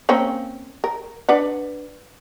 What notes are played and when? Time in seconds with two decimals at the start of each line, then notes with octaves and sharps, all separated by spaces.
0.09 A#3 C4 C#4
0.84 A#4
1.29 D4 B4 F#5